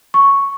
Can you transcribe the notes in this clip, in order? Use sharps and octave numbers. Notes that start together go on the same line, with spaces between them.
C#6